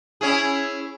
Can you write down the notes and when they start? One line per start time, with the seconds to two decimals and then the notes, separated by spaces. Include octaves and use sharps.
0.21 C#4 E4 G#4